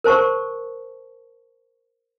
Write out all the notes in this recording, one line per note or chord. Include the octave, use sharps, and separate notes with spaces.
A#4 C5 A5 C#6